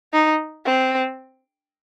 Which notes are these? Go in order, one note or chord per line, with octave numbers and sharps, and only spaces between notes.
D#4
C4